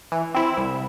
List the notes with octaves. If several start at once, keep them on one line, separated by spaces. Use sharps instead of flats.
E3
C4 E4
C2